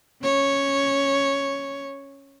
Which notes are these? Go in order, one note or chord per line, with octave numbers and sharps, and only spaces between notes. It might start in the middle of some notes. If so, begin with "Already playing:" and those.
C#4 C#5